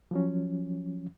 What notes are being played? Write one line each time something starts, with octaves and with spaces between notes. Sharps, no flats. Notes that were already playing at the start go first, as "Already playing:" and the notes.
F3 F#3 C#4